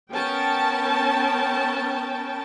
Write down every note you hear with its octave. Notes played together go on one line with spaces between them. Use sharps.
B3 C#4 A#4 G5 A5